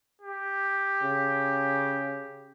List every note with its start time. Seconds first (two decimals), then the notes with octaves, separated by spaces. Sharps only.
0.21 G4
1.02 C#3